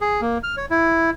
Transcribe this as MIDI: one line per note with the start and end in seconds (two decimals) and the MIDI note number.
0.01 0.21 68
0.21 0.38 58
0.43 0.56 89
0.57 0.66 73
0.71 1.10 64